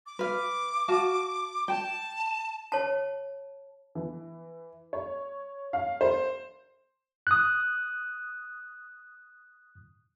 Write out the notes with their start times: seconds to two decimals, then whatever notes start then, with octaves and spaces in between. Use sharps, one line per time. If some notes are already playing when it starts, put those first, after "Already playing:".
0.06 D6
0.19 B4 F5
0.88 F#4 F5 A5
1.68 G5 A5
2.72 C#5 A5
3.95 E3
4.93 C#5
5.73 F5
6.01 C5
7.27 D#6 F#6